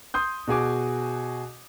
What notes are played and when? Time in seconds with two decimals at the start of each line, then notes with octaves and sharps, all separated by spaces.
0.14 C6 D#6 G6
0.47 B2 F#4 G#4 G#5 D6